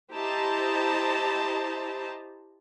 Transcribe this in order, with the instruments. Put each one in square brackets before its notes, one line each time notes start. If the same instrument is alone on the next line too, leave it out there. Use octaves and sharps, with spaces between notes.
[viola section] E4 G4 C5 D#5 A5 A#5